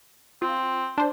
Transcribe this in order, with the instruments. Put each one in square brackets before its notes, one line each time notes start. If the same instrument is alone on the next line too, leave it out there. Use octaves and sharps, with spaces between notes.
[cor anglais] C4 [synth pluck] F4
[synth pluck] D4 C5